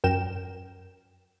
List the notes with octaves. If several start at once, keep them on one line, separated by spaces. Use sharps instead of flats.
F#2 A#4 G5 E7